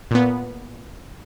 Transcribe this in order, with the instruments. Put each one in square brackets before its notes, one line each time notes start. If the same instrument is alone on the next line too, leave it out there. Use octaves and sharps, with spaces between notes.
[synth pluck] A#2 B3